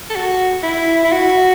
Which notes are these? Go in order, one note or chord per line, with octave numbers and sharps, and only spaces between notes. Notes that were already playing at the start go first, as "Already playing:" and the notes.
A4
F#4
E4
E4
F#4